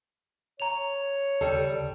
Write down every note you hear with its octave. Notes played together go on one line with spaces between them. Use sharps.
C#5 A#5 F7
D#2 C#3 G3 A4